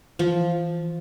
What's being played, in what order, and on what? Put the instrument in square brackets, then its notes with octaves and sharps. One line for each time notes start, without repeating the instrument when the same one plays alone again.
[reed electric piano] E3 [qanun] F3